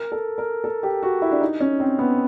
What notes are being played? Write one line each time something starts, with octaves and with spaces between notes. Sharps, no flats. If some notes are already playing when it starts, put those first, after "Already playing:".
Already playing: A#4
A4
A#4
A4
G4
F#4
E4
D4
D#4
C#4
C4
B3